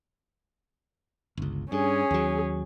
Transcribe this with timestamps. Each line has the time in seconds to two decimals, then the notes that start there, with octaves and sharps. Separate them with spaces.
1.37 G1 C#2
1.72 G2 C#4 G#4
2.11 D#2 F#3